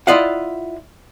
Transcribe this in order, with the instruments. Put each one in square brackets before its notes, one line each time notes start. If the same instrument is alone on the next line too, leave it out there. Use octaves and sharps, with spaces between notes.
[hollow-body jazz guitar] E4 F4 D5 D#5 F5 F#5